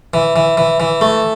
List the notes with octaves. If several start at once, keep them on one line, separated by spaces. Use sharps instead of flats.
E3
E3
E3
E3
A3